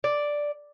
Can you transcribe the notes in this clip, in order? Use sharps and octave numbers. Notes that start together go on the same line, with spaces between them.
D5